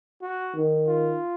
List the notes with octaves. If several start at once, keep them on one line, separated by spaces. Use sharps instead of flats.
F#4
D#3
F4